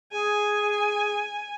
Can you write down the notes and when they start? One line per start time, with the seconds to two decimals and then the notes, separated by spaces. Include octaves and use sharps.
0.12 G#4 G#5